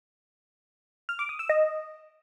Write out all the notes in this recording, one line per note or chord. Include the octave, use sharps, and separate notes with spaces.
F6
D6
D#6
E6
D#5